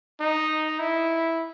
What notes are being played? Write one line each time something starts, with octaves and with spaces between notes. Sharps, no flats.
D#4
E4